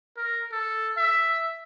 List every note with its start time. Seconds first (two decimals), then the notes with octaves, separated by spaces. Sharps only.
0.17 A#4
0.52 A4
0.97 E5